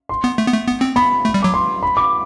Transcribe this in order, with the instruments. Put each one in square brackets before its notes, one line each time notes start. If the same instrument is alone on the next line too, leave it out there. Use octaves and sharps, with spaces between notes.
[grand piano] C6
[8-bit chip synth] B3
A3
B3
A3
B3
C4
[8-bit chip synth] B3 [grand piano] B5
[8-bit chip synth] A3
G3
[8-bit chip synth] F#3 [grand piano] D6
[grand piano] C6
B5
D6